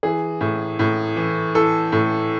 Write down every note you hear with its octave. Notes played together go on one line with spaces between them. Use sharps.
E3 G#4
A2
A2
E3
E3 A4
A2